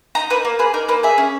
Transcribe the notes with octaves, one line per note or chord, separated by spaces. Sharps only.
D#4 A#5
A#3 B4
A#3
G#4 B4
D#4 A#4
A#3 B4
G#4 E5
C#4